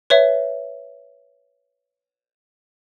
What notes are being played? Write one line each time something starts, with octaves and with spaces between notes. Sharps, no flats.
B4 C#5 E5